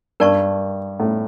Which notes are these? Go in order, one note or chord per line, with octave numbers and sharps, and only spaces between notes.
G2 A#4 D5 A5 C#6
A2